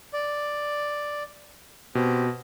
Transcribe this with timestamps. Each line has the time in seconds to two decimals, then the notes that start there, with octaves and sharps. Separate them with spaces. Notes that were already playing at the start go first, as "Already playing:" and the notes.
0.13 D5
1.95 B2 C4 G4